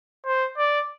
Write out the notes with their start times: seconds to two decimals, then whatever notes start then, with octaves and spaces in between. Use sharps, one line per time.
0.26 C5
0.58 D5